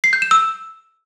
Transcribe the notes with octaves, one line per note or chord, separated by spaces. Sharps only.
C7
G6
E7
E6